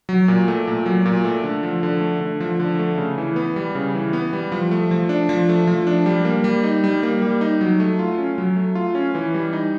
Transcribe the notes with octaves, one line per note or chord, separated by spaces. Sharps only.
F#3
A#2
A3
A#2
F#3
A#2
A3
D3
F3
D3
A3
D3
F3
D3
A3
C#3
E3
B3
G3
C#3
E3
B3
G3
F3
A3
F3
D4
F3
A3
F3
D4
G3
A#3
G3
D#4
G3
A#3
G3
D#4
F#3
A3
F4
C#4
F#3
A3
F4
C#4
E3
G3
D#4